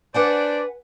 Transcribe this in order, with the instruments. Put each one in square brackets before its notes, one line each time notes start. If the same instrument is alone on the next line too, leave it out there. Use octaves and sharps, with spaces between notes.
[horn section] D4 C5 D5 [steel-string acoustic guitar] B4 F#5 G#5